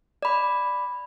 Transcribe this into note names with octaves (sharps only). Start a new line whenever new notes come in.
D5 B5